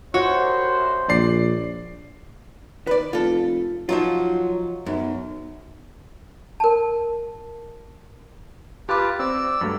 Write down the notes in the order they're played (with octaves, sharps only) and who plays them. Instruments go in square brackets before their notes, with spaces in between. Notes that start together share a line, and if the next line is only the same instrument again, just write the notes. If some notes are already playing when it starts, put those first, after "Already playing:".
[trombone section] C2 C5 [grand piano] F#4 [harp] C#5
[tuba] A#1 [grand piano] D5 C7
[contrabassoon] D#3 [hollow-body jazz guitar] B4 D5
[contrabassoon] F1 [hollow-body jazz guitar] F4 A4
[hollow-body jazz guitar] F3 D#4 F4 [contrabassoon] F#3
[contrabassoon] B1 [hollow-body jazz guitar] F#2
[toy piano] A#4 A5
[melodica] F4 B4 A5 [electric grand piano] G4 D6
[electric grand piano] C4 [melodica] D5 E6
[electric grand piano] G2 F#3 A3